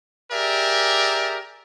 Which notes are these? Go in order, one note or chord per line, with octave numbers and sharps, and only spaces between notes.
G4 G#4 A#4 D5 E5